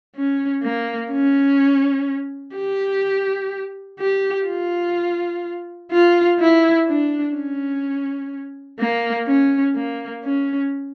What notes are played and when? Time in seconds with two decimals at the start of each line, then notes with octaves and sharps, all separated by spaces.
0.16 C#4
0.63 A#3
1.12 C#4
2.56 G4
4.00 G4
4.48 F4
5.91 F4
6.39 E4
6.88 D4
7.36 C#4
8.80 A#3
9.28 C#4
9.75 A#3
10.24 C#4